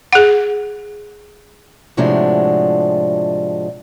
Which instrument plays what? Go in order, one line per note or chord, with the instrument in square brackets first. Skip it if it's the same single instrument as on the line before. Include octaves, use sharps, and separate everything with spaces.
[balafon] G#4 F#5
[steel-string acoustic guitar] A2 C3 F3 G#3 D4 F#4